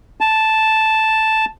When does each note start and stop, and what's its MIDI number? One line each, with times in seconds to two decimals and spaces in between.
0.21 1.45 81